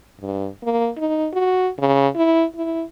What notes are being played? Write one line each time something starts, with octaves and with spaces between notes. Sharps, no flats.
G2
A#3
D#4
F#4
C#3
E4
E4